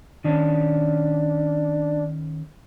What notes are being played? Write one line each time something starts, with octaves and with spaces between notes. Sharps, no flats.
D#3 C#4 D4